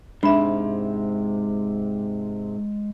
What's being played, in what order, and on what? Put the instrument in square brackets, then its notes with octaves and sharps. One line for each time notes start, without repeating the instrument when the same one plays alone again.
[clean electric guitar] G#2 C3 [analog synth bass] G#3 [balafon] D4 [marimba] E5 B5